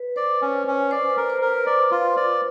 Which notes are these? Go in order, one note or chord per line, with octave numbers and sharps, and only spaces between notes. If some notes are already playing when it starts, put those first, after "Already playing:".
Already playing: B4
C5 D5
C#4
C#4
C5 D5
B4
A#4
C5
A#4
B4
D5
F4
D5